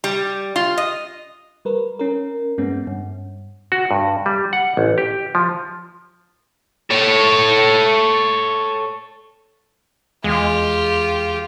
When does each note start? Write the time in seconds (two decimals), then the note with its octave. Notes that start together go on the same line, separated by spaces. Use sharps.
0.04 G3
0.56 F4
0.78 D#5
1.65 G3 A#4 B4
1.99 C#4 A#4
2.58 G2 G#3 A#3 B3 C#4
2.87 G2
3.72 F#4
3.91 G2
4.26 G3
4.53 F#5
4.77 A1
4.98 G4
5.35 F3
6.90 A4 C#5
10.24 E2 G#3 F4 G4